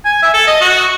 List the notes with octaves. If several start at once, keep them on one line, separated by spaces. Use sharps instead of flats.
G#5
E5
A4
D#5
F#4